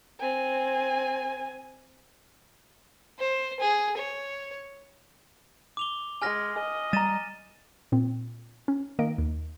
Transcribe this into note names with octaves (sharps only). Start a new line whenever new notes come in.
C4 G#5
C5
G#4
C#5
D6 F7 G7
G#3 G#5 F6 A#6
D#5
G3 A#5 A6 D#7 E7
A#2 C4
C#4
D#3 A#3 D#5 D7
D#2